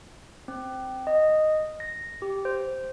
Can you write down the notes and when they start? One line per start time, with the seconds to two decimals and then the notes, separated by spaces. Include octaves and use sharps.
0.48 C4
1.07 D#5
1.80 A#6
2.22 G4
2.45 C5